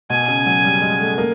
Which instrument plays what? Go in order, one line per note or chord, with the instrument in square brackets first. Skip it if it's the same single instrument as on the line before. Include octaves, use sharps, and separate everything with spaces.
[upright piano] B2 [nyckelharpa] G#5
[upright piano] C#3
F#3
G3
G#3
A3
A#3